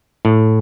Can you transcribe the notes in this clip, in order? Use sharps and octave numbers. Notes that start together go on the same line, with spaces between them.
A2